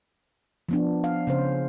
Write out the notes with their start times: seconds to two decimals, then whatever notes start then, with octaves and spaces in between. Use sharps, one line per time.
0.69 F3 B3 D4
1.04 F5
1.27 C#3 C#4 C5